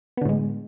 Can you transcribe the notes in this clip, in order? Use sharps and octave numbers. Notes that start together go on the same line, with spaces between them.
A2 D3 G#3 B3